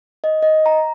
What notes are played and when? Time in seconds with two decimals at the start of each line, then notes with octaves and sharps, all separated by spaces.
0.24 D#5
0.42 D#5
0.66 A#5